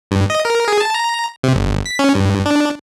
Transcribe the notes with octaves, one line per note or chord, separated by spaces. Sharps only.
G2
D#5
A#4
G#4
A5
A#5
C3
G1
B6
C#4
G2
D4